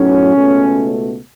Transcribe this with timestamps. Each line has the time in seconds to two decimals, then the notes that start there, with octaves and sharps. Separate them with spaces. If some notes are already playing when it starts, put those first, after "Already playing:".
Already playing: B1 A2 F#3 C#4
0.33 C#2 B2 A3